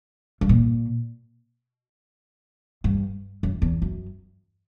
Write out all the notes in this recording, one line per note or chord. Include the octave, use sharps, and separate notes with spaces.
G2
A#2
G2
F#2
E2
F#2